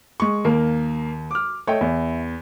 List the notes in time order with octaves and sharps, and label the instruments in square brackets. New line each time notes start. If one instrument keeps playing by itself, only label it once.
[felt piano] G#3 C#6
[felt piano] D#2 [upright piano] A#3 A#4
[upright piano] D6 F6
[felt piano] A3 [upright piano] C#5 D#5 G5
[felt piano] E2 [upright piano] E4